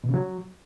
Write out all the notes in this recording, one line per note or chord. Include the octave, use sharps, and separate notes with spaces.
B2
C#3
F#3